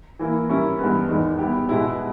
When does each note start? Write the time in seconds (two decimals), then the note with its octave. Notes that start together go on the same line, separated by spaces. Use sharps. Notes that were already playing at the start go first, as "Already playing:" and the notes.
0.19 E3 A#3 E4
0.49 G3 C#4 E4 A#4
0.79 G2 E3 G#3 B3
1.09 E2 D#3 G#3
1.39 G3 B3 E4 G4
1.69 B2 G#3 B3 E4 G4